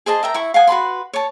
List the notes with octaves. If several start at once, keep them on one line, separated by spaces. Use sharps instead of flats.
G#4 C5 D#5 A5
A#4 E5 G5 A#5
E4 B5 C#6
F5 F#5 G#5 D#6
F#4 B4 B5 C6
C#5 A5